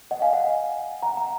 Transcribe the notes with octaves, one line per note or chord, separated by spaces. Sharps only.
D#5 F#5
F5 G#5
D#5 F#5
F#5 A#5
F#5 A#5